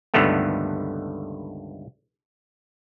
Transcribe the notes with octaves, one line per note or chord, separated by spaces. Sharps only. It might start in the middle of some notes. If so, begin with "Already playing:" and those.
C#2 G2 D3 D#3 A3 B3